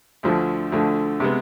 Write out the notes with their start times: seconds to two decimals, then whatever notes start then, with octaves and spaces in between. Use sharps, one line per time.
0.23 D2 D3 F3 A3
0.72 D2 D3 F3 A3
1.20 C3 G#3 B3